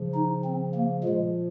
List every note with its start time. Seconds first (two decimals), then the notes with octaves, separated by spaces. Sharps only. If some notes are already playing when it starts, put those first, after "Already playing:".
Already playing: C#3 F3
0.15 D#4
0.45 C4
0.74 A#3
1.04 A#2 G#3
1.08 F3